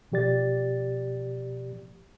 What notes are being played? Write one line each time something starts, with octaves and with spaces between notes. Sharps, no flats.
B2 F3 G4 D5 A6